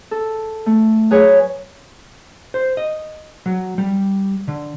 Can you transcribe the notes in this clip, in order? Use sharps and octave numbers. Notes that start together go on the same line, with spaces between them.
A4
A3
F#3 G#4 B4 C#5
C5
D#5
F#3
G3
D3